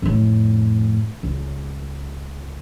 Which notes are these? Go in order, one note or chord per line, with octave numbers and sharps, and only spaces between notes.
F2 A2
C#2